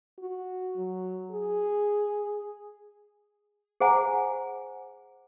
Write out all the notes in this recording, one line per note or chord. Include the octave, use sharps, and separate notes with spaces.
F#4
F#3
G#4
G#4 C5 F#5 G#5 A#5